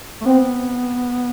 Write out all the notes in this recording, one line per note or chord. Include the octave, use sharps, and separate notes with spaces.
A3
B3 C4